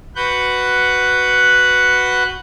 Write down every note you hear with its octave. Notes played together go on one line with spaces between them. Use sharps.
F#4 B4 F#5 F#6 G6